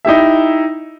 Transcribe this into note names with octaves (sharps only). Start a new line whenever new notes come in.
D#4 E4 G4 E5